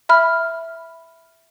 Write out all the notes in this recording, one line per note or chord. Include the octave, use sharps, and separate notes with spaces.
E5 B5 F6